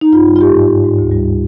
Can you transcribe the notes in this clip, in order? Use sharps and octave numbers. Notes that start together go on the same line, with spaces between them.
D#4
G2 F4
G3
F4
G#2 G4
G#2
G#2
G#2
D2
G3